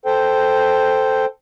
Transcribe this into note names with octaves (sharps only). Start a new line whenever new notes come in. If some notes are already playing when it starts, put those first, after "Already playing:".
A4 C5 G5